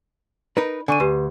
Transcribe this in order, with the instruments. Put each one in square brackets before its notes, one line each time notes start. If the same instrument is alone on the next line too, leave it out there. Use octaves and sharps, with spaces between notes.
[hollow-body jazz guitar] D#4 A#4 B4
[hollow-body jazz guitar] D3 [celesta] G#5 C#6 D#7
[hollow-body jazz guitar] D2 [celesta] G4 B4